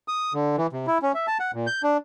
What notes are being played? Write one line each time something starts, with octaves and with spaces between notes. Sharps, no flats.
D#6
D3
E3
C3
E4
C#4
E5
A5
F#5
A#2
G6
D4